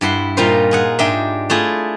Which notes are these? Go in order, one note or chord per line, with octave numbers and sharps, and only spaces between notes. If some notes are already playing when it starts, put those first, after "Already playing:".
G2 E4 F#5 C6
A#2 G3 D#4 F4 A#4 C5
F4 G#4 F#5
G#2 D4 G4 D#5 E5
A3 E4 F4 G#4